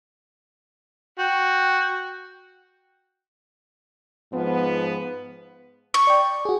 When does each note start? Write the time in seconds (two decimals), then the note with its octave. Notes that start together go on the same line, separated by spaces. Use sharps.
1.19 F#4 G5
4.32 G#2 F3 B3
5.94 C#6
6.07 D5 G5
6.45 F#4 G#4